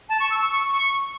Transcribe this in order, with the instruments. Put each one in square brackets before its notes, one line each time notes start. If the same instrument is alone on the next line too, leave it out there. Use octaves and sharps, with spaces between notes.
[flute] A5
C#6
E6
C#6
C#6